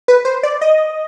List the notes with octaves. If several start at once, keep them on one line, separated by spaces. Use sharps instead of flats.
B4
C5
D5
D#5